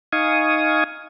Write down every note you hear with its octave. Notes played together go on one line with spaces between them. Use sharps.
D#4 F5 G#5 C#6 D#6